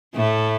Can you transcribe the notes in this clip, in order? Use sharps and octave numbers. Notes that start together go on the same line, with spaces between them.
A2 A3